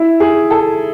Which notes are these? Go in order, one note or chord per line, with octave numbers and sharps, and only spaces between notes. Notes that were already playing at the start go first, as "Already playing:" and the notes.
Already playing: E4
G#4
A4